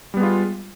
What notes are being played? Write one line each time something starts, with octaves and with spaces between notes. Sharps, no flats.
G3 G#3 B3 F4